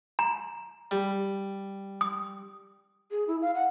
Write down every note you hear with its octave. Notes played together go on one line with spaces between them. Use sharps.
A#5
G3
D#6
G#4
E4
F5
F#5